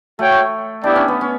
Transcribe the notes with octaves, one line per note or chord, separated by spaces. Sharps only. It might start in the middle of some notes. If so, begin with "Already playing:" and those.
A3 F#4 C#5 G5
B3 D4 E4 G4 D5 G5
C#4
B3
C#4